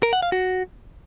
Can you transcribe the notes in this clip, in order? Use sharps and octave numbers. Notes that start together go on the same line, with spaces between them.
A#4
F#5
F5
F#4